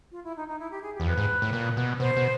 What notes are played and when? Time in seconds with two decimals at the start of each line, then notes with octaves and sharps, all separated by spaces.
0.12 F4
0.24 E4
0.36 D#4
0.48 D#4
0.59 E4
0.71 G4
0.82 G#4
0.95 G4
1.00 E2
1.06 F2 B4
1.18 G#2
1.42 A2
1.53 A#2
1.77 B2
2.00 B2 C5
2.17 B2